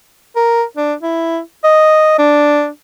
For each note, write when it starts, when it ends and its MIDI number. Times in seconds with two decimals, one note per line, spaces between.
0.36 0.63 70
0.77 0.94 62
1.03 1.40 64
1.64 2.18 75
2.19 2.68 62